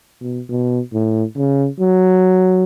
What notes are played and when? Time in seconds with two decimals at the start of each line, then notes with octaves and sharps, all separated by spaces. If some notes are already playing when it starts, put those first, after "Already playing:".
0.21 B2
0.49 B2
0.93 A2
1.37 C#3
1.80 F#3